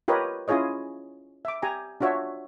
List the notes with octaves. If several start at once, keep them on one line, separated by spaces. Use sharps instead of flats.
F4 G4 A#4 B4 C#5 D#5
C#4 E4 F4 G#4 C#5 D#5
E5 D6
G4 G#5 A#5
D4 F4 F#4 C#5 E5